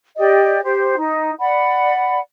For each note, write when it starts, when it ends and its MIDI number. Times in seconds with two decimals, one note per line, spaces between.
0.17 0.59 67
0.17 0.59 74
0.17 0.59 75
0.64 0.93 67
0.64 0.93 72
0.97 1.30 63
1.39 2.18 74
1.39 2.18 78
1.39 2.18 83